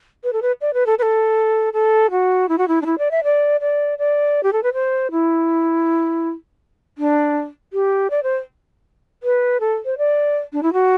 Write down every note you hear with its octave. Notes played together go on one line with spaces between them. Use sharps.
B4
A4
B4
D5
B4
A4
B4
A4
A4
F#4
E4
F#4
E4
D4
E4
D5
E5
D5
D5
D5
G4
A4
B4
C5
E4
D4
G4
D5
C5
B4
A4
C5
D5
D4
E4
F#4